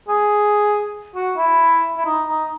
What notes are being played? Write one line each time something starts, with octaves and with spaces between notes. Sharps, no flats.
G#4
F#4
E4
E4
D#4
D#4